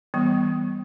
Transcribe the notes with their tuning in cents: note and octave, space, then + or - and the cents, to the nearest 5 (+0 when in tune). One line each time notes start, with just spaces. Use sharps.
E3 -20 G3 +0 B3 +0